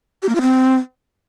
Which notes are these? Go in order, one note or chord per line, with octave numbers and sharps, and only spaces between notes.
G4
A#3
F4
C4